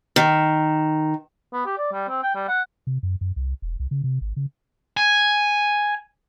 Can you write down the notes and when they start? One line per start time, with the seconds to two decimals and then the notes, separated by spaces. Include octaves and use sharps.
0.16 D#3
1.53 B3
1.66 G4
1.78 D5
1.92 G3
2.08 C4
2.23 G5
2.35 G3
2.48 F#5
2.87 C3
3.03 F#2
3.21 F#2
3.36 C2
3.62 E1
3.80 C2
3.91 C#3
4.04 C3
4.21 G#1
4.36 C#3
4.97 G#5